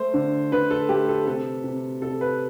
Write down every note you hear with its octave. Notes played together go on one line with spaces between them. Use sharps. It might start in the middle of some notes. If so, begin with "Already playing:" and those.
Already playing: A3 C5
D3
D3 B4
A4
A3 G4
A4
C3 A4
C3
C3 A4
B4